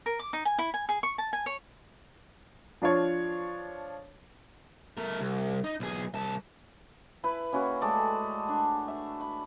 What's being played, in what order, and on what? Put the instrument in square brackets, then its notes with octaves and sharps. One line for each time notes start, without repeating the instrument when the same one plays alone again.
[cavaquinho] A#4
D6
D#4
G#5
E4
G#5
G#4
C#6
A5
G#5
C#5
[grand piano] F3 D4 F4 C#5
[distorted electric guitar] A3 A#4
C2
D#4 D#5
B1 G#4
C2 A5
[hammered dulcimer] E4 B4 B5
A#3 C#4 E4 F#4
G#3 A3 A4 D5
D4
E5
B5